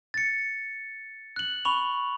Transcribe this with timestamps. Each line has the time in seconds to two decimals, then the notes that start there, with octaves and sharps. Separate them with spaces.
0.14 A6 C#7
1.36 F#6 F#7
1.65 B5 C#6 F7